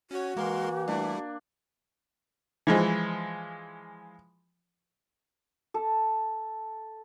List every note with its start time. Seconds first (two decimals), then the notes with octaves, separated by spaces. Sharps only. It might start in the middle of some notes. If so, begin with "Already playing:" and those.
0.11 C#4 F#4 C#5
0.37 E3 G#3 A#3 A#4 C6
0.88 G3 A3 D4 E4
2.67 E3 F3 G#3
5.74 A4